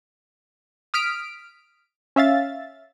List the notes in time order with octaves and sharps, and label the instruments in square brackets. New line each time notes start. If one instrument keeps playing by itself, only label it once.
[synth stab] D#6 F6 B6 D7
C#4 E5 F5 A6